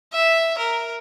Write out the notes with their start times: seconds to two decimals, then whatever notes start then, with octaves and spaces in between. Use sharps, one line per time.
0.13 E5
0.58 A#4